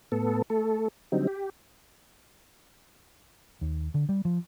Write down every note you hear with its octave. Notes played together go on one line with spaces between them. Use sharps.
A2 B3 A4
A3 A4
D3 F#3 G3 C4 D#4
G4
D#2
D3
G3
F3